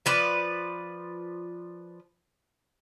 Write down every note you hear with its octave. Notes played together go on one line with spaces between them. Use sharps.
F3 B4 D5